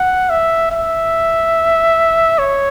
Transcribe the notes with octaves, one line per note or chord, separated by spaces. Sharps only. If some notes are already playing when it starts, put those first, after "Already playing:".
Already playing: F#5
E5
E5
C#5